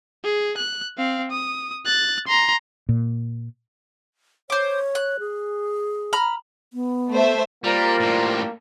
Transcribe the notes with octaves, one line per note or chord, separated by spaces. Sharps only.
G#4
F#6
C4 F5
D#6
F#6 A6
A#5 C6
A#2
C5 C#5 D6
F#6
G#4
A#5 B5 F6
B3
A3 C5 E5
G3 A#3 F4 A#4 C5 D5
A2 G3